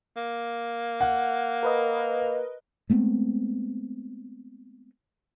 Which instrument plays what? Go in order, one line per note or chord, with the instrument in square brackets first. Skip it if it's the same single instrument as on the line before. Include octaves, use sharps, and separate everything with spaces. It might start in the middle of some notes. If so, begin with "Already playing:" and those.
[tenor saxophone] A#3
[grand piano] F#5
[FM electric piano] A#4 B4 D#5
[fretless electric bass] G#3 A3 B3 C4